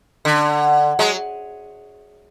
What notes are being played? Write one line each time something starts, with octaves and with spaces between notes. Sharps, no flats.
D3
F#3 G#3